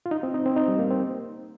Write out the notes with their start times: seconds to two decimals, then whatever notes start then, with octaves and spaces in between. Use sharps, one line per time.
0.06 F4
0.11 D#4
0.23 C4
0.34 D#4
0.46 C4
0.56 D#4
0.68 G3
0.79 A#3
0.90 C4